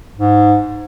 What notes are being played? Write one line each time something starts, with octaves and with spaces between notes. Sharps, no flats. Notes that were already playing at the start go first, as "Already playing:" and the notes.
G#2